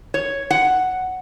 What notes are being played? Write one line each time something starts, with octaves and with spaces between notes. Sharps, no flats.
C#5
F#5